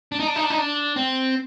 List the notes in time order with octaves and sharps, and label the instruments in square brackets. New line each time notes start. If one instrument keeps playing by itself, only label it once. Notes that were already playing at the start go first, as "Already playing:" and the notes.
[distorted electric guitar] D4
D#4
D4
D#4
D4
D#4
D4
C4